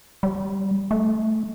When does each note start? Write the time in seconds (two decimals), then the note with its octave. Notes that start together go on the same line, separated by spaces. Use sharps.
0.23 G3
0.91 A3